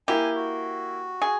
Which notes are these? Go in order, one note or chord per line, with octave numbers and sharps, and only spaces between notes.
A#3 E4 G4 G#5
F#4
G#4